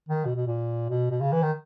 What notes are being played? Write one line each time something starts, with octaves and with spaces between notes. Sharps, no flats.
D#3
B2
B2
A#2
B2
B2
C#3
E3
D#3